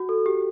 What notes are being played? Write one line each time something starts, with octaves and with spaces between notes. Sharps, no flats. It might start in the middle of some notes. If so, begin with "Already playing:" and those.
Already playing: F#4
A4
G4